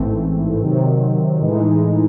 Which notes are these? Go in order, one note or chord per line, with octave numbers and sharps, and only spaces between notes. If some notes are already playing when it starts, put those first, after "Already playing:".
Already playing: A1 G#2 E3 A3 C4
C3 D#3 F#3 C4
A2 E3 G#3 D#4